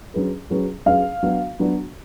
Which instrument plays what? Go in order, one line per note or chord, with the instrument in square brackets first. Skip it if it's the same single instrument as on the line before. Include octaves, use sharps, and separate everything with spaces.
[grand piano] F#3 C#4 G#4 B4
F#3 C#4 G#4 B4
[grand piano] F#3 C#4 G#4 B4 [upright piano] F5
[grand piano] F#3 B3 D4 F#4
F#3 B3 D4 F#4